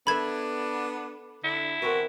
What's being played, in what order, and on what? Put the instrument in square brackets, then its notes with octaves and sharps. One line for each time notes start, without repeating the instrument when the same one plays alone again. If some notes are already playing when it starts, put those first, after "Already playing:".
[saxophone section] B3 D4 [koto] A4 B4 E5 [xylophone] B5 G#6
[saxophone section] D3 [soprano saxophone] E4
[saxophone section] B2 E3 F#4 [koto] C4 A#4 B4